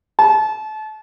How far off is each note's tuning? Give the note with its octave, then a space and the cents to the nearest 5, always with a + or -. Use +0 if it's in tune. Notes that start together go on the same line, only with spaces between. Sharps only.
A5 -30